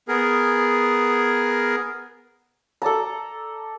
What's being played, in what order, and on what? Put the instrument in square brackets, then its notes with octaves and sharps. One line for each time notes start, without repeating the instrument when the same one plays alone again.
[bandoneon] B3 G#4 A#4
[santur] A4 D5 A5 A#5